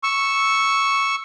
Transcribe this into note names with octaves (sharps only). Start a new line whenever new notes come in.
C#6 E6